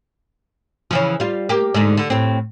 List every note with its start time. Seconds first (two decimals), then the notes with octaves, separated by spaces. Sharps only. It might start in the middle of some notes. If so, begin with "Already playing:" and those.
0.91 C#3 E3 F3
1.20 G3 F4
1.49 A#3 G4
1.74 G#2 D3
1.97 D3
2.10 A2 C4